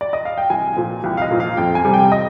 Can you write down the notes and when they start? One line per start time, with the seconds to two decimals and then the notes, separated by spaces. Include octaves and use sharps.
0.01 D5
0.13 D#5
0.25 F5
0.38 G5
0.50 C2 G#5
0.77 A#2 F3
1.04 C2 G5
1.17 F5
1.22 D#5
1.31 A#2 F3
1.40 F5
1.57 F2 G5
1.75 G#5
1.85 C3 G3
1.94 G5
2.12 D#5